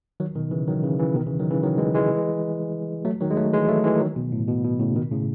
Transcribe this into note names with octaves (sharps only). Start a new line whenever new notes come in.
D#3 F#3
B2 D#3
C#3 E3
D#3 F#3
C#3 E3
C#3 E3
B2 D#3
C#3 E3
D#3 F#3
C#3 E3
D#3 F#3
E3 G#3
E3 G#3
F#3 A3
D#3 F#3
G#3
F#3 A3
E3 G#3
F#3 A3
E3 G#3
D#3 F#3
B2
A2
B2
B2
A2 C#3
B2 D#3
A2 C#3